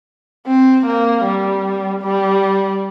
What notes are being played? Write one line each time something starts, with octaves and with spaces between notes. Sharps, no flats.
C4
A#3
G3
G3